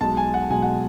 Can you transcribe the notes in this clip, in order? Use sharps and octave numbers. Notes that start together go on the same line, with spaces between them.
B1 B2 G#3 A5
G#5
F#5
B1 B2 G#3 G#5
F#5